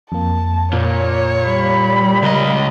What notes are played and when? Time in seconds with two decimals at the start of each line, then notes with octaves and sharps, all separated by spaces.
0.12 F2 A#3 A5
0.73 A#2 C#5
1.46 G3 B5
2.23 C#2 A#4 D#5